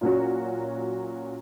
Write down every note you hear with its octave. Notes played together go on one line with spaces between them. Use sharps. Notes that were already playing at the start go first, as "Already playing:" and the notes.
A#2 F#3 C#4 F#4